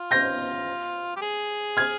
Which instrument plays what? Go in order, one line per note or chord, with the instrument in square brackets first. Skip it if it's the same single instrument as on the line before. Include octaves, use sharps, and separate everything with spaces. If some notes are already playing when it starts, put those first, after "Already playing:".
Already playing: [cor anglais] F4
[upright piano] G6 A#6
[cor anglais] G4
G#4
[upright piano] F6 G#6